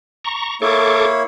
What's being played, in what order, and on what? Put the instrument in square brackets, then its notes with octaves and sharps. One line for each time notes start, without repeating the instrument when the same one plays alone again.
[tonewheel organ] A#5 C#6
[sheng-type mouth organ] A#3 E4 C#5 [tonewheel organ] A4 C#6 D6